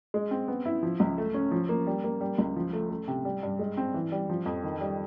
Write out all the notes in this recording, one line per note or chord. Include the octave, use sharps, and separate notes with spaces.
G#3
C4
B3
E4
F3
C#2
A3
C#4
F3
A#3
G3
A#3
G3
C#2
F3
A3
A3
C3
G3
G2
G#3
C4
E3
G3
F3
F2
D#3
G3